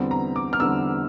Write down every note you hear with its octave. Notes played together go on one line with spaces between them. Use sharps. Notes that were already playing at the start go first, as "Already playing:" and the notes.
Already playing: E2 D3 G3 C4
A#5
D6
F6
E2 D3 G3 C4 E6